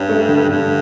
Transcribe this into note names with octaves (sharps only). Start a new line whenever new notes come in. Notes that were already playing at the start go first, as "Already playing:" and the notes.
Already playing: G2 C#4
A3
D3
G2 D3